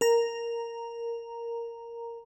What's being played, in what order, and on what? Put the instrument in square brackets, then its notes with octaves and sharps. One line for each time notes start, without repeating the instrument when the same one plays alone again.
[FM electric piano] A#4 A#5